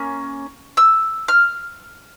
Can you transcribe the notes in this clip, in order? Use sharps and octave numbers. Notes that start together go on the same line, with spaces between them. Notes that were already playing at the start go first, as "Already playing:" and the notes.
Already playing: A#3 C#4
E6
F6